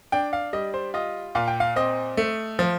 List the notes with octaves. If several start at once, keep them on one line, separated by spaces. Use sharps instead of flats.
D4 G5
F5
G3 D#5
C5
F4 D#5
A#2 F5
G5
F5
C4 D#5
A3
F3